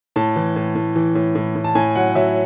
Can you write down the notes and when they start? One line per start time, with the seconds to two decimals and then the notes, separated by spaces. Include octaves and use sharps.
0.16 A2 A5
0.36 E3
0.56 A2
0.75 A2
0.96 E3
1.15 A2
1.35 A2
1.55 A2
1.64 A5
1.75 A2 G#5
1.95 F#3 F#5
2.15 F#3 E5